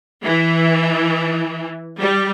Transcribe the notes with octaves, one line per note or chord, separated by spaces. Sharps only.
E3
G3